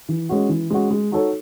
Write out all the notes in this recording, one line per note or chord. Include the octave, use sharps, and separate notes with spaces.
E3
G#3 C#4 F#4
E3
G#3 C#4 F#4
G#3
D#4 F#4 A4 C#5